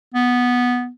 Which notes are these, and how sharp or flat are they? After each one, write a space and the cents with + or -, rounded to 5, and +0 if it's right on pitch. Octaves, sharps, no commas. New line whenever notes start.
B3 -5